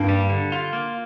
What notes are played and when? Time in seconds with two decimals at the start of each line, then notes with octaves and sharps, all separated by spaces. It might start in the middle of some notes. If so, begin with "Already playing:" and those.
Already playing: G2 A#3
0.09 G3
0.30 D3
0.52 F4
0.73 A#3